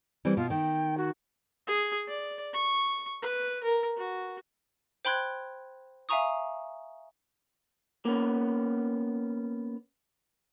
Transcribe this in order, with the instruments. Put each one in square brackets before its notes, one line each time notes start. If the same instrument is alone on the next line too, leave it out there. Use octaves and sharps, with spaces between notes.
[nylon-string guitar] E3 G3 C4
[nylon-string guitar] B2 [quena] F4
[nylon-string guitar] D#3 [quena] G5
[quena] F#4
[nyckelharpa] G#4
D5
C#6
B4
A#4
F#4
[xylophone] C5 G5 B5 C6 F#6 G#6
E5 F5 G#5 A#5 C#6 D#6
[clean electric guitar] A#3 B3 C#4